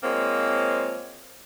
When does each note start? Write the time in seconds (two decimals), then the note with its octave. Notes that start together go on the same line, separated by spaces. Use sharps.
0.02 F3 G#3 A#3 C4 C#5